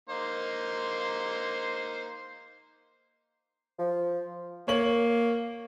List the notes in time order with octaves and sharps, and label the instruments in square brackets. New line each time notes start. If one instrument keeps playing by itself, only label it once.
[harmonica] A#3 D#4 C5
[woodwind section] F3
[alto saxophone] A#3 [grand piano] C#5 F#7